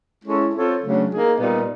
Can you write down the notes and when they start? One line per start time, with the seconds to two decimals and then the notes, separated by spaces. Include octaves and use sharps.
0.23 G#3 C#4 E4 A4 C#5
0.53 C4 F4 A4 C#5
0.81 C#3 F#3 A3 D4
1.10 A#3 D#4 G#4
1.39 A#2 G3 B3 D#4